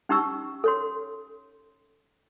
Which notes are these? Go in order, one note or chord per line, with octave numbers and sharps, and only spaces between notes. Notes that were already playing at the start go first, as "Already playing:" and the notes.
C#4 D#4 G4 A#5 C#6 E6
A4 C#5 C6